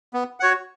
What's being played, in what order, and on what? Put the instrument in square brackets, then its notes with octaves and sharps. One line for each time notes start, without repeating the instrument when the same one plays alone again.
[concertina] B3
F#4 C#5 F#5